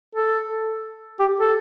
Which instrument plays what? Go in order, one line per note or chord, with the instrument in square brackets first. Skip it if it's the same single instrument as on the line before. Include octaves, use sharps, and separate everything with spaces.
[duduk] A4
G4
A4